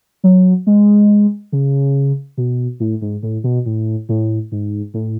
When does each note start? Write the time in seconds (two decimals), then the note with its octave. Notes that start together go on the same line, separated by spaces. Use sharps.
0.24 F#3
0.67 G#3
1.52 C#3
2.38 B2
2.80 A2
3.02 G#2
3.23 A2
3.44 B2
3.66 A2
4.09 A2
4.52 G#2
4.94 A2